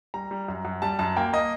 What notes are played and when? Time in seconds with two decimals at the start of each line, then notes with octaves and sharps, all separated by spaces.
0.14 G3 A#5
0.31 G3
0.48 F#2
0.65 F#2
0.82 G3 A5
0.99 F#2 A5
1.16 A#3 G5
1.33 A#3 D#5